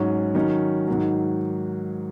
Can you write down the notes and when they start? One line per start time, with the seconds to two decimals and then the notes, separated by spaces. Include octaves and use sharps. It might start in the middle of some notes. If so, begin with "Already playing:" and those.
Already playing: G#2 F#3 C#4
0.35 D#3 F#3 C#4
0.88 G#2 D#3 F#3